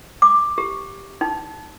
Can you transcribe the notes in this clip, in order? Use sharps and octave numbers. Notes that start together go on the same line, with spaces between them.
D6
G4
D#4